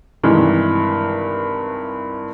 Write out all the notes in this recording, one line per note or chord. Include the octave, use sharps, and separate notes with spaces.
G2 C3 D#3 E3 G#3